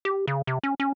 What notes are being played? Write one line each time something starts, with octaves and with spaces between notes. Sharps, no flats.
G4
C#3
C3
C#4
C#4